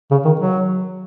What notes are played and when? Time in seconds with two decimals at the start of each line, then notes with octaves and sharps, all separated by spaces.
0.11 C#3
0.25 D#3
0.40 F#3